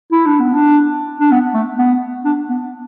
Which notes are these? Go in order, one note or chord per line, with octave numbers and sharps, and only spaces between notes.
E4
D4
B3
D4
D4
B3
A3
B3
D4
B3